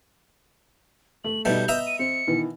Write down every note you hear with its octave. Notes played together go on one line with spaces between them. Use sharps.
A3 F#7
B2 G3 A3 B3 D#4 G6
B3 D#5 E5 A#5
D#7
C4 C#7
B2 D#3 E3